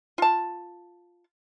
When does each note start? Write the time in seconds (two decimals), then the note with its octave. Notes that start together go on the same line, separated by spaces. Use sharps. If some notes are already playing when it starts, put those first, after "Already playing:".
0.18 F4 A5